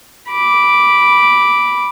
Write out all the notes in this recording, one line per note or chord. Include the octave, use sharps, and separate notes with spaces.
B5 D6